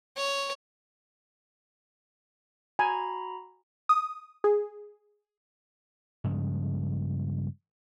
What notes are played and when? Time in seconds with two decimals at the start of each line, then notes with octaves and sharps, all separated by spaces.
0.17 C#5
2.79 F#4 G#5 A#5 B5
3.89 D#6
4.44 G#4
6.24 G2 C#3 F3 G#3